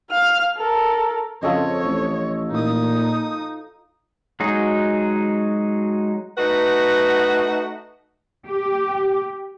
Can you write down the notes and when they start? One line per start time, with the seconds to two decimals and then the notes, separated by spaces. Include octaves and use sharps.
0.10 F5 F6
0.58 A4 A#4
1.43 F2 C#3 F3 A4 C#5 D#5
1.84 A1
2.51 A#2 D#4 D#6
4.40 F#3 G#3 D#4 F#4 G#4
6.37 A3 D#4 F#4 B4 F#5
8.47 G4